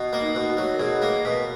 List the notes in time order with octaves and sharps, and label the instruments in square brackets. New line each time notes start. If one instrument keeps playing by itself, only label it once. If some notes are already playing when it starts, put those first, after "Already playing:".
Already playing: [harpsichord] B2
A#3
[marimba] D#4
[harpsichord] B2
[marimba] F#4
[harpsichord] F#3
[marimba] A#4
[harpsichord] B2 [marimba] G#4
[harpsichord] A#3 [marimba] A#4
[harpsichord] B2 [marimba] B4